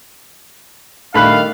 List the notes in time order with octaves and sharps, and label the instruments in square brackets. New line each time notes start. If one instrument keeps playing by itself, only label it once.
[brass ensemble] D#3 G3 F5 [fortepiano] A3 B5 F#6